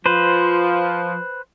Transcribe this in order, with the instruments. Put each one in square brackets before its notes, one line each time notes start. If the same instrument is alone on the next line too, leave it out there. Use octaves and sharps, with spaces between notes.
[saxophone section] F3 [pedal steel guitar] B4 C5